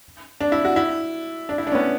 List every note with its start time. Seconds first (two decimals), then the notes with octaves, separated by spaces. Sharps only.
0.41 D4
0.52 E4
0.65 F#4
0.76 E4
1.49 D4
1.58 E4
1.67 D4
1.72 C#4
1.75 B3